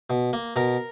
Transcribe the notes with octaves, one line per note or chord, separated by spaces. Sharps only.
B2
A#3
B2 A#4 A#5